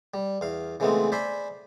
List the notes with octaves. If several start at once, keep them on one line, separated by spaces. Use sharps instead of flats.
G3
E2 F5
C#3 E3 G#3 A3 B3 C4
C5 D5 E5 G#5 B5 C6